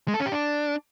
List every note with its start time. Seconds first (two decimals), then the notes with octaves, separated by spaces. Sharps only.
0.08 G#3
0.14 A4
0.20 C#4
0.26 G4
0.32 D4